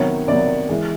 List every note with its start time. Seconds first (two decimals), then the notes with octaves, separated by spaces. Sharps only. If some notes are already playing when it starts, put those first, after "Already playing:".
Already playing: C3 D#3 F#3 B3 C#5
0.28 C3 D#3 F#3 B3 D5
0.69 E3 G#3